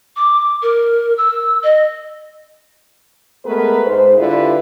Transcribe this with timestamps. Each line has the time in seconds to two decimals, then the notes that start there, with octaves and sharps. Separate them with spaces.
0.16 D6
0.62 A#4
1.18 E6
1.63 D#5
3.44 G#3 A3 B3 G#4 A#4 B4
3.86 G#2 C5
4.18 D3 G3 E4 F4 G#4 B4